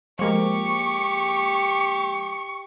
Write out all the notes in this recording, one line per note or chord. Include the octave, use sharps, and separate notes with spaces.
F3 G#3 A#3 G4 C#6